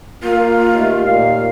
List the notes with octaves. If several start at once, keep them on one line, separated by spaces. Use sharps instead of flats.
A#3 F4
D#2 A3
A#2 F5